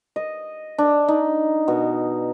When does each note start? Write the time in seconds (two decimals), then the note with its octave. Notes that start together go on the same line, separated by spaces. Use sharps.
0.16 D#5
0.78 D4
1.08 D#4
1.68 B2